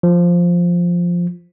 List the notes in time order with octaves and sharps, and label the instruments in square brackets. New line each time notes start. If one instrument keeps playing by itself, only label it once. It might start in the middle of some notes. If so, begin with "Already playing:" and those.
[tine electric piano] F3